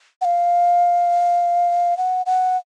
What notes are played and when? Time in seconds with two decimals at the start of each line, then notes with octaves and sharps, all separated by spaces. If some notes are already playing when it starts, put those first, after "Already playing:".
0.21 F#5
0.25 F5
1.97 F#5
2.26 F#5